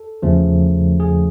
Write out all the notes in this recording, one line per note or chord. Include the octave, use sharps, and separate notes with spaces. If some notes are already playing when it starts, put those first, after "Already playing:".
Already playing: A4
E2 C#3 F3 A3
G#4